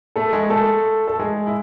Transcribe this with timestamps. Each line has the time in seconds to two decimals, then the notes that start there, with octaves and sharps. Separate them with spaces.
0.16 A3 A4
0.33 G#3 G#4
0.50 A3 A4
1.08 A4
1.19 G#3 G#4
1.47 E4